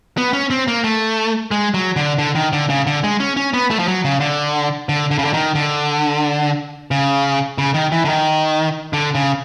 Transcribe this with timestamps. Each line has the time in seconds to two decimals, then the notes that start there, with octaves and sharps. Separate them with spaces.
0.18 B3
0.33 C#4
0.50 C4
0.68 A#3
0.84 A3
1.51 G#3
1.74 F#3
1.96 D3
2.18 D3
2.35 D#3
2.53 D3
2.69 C#3
2.87 D3
3.04 G#3
3.20 C#4
3.37 C#4
3.53 B3
3.70 A3
3.79 F3
3.88 F#3
4.05 C#3
4.20 D3
4.89 D3
5.11 D3
5.19 C#3
5.25 D3
5.34 D#3
5.55 D3
6.91 C#3
7.58 C#3
7.74 D#3
7.92 E3
8.05 D3
8.09 D#3
8.93 D3
9.15 C#3